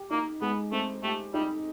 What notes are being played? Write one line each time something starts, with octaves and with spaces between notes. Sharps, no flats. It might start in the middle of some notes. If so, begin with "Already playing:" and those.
Already playing: G4
A#3 D#4
G#3 B3
A3 C4
A3 G4
G3 D#4